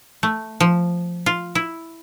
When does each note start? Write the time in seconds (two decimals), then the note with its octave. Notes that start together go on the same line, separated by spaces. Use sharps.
0.23 A3
0.60 F3
1.26 F4
1.55 E4